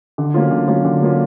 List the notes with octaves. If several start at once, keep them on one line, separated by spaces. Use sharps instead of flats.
D3
F#3 A#3 C#4 F4
D3
F#3 A#3 C#4 F4
D3
F#3 A#3 C#4 F4